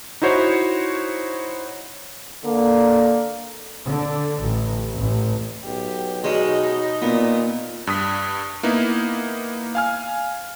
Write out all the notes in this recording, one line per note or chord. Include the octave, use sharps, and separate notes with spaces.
D#4 E4 F#4 C5 C#5
D3 A#3
D3
A1
A1
B1 G4
B2 G#3 C#4 D#4
A#2 B3
G2 D#6 B6
A#3 B3 D#4 E4
F5 G#5 F6